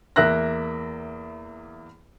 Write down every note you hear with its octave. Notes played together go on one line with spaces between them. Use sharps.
E2 A#3 E5 A#5 F#6 A#6